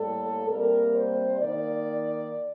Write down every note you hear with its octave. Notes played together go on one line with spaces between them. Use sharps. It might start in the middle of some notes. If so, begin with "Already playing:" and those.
Already playing: A2 G3 A#3 A4
C3 G3 A#3 A#4
C5
D#3 A#3 D5